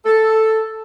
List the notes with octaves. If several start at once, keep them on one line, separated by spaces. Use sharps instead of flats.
A4